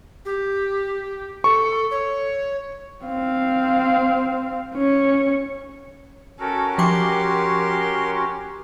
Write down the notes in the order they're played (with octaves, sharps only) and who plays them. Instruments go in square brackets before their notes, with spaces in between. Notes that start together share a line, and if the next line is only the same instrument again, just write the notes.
[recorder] G4
[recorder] A4 [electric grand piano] C#6
[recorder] C#5
[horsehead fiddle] C4 F5
C#4 C#5
[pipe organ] C#4 F#4 A#4 [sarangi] A4
[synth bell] F3 G5 D6 [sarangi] G4 [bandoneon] C6